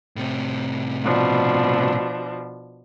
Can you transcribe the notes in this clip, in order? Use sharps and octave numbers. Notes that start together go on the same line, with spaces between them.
A2 C3
B2 F3 D4